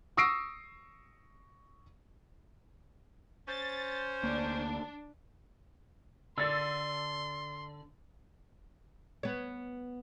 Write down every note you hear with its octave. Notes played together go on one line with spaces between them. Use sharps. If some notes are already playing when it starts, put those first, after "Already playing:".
C#6 D#6 E6 A#6 C7 D7
C#4 C5 A6
D2 A#3 D4
D3 D5 C6 E6 A6
B3 C#5